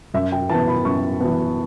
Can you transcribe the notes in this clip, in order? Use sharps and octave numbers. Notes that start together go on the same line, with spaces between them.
F#2 E5
G5
E3 B3 A5
B5
F#2 C#6
E3 B3